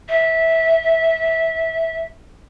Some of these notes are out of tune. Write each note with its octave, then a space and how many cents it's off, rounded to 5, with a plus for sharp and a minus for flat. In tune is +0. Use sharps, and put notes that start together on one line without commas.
E5 -15